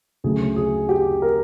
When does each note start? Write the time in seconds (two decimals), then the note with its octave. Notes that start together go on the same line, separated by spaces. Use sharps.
0.24 D2 C#3 F#3 A3 G#4
0.56 G#4
0.89 G4
1.22 A#4